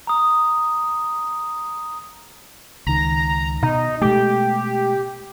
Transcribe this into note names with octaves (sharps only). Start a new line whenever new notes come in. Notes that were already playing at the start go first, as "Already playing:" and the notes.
A#5 D#6
C#2 D#3 A#5
B2 D#4
B2 G#3 A3 G4